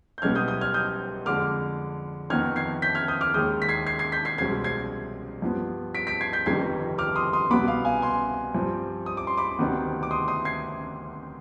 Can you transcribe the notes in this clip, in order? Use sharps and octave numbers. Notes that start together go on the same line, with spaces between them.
G6
B1 B2 G3 B3 F6 G#6
D#6 G6
D#6 G6
F6 G#6
D#6 G6
F2 D3 G#3 D6 F6
F2 D#3 B3 F6 G#6
G#6 C7
G6 B6
F6 G#6
D#6 G6
D6 F6
D#2 D#3 G#3 D#6 G6
B6
G#6 C7
G#6 C7
G#6 C7
G6 B6
G#6 C7
C2 B2 G#3 C4 G#6 C7
G#6 C7
G2 F3 B3
B6 D7
B6 D7
G#6 C7
G6 B6
G1 F2 C3 D#3 G3 G#6 C7
D6 F6
C6 D#6
C6 D#6
C2 B2 B3 B5 D6
F5
F5 G#5
G#5 C6
G2 F3 C4
D#6
D6
C6
B5 D6
D2 C3 D#3 B3
D6
C6 D#6
C6 D#6
G#6 C7